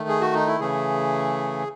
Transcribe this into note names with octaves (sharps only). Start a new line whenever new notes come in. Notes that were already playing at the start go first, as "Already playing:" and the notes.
Already playing: D#3 A3
G#4
F#4
D#4
E4
C#3 E3 A3 G#4